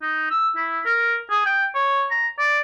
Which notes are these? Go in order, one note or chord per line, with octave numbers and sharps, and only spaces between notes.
D#4
E6
E4
A#4
G#4
G5
C#5
A#5
D5